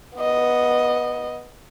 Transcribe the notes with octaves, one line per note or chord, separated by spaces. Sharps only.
B3 D#5